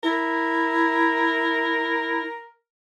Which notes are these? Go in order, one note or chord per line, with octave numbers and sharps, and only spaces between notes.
E4 A#4